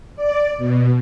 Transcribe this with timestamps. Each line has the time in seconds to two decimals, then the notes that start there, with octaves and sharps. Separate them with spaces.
0.16 D5
0.58 B2